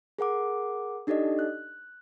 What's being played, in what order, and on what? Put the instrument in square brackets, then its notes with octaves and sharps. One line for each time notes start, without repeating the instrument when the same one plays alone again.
[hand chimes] G#4 A#4 F#5 D6
D4 D#4 G4 A4 D5 D#5
F#6